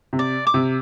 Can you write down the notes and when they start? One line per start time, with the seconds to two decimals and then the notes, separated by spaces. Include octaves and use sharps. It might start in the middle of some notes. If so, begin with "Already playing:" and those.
0.13 C3
0.19 D5
0.47 D6
0.54 C3